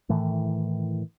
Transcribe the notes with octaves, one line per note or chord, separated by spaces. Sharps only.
A2 D#3 E3 A3